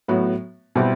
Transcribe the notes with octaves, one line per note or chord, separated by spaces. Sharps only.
A2 F#3 B3 F#4
B2 G3 C4 E4 G4